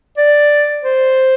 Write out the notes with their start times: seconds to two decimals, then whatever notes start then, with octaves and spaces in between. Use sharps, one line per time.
0.17 D5
0.84 C5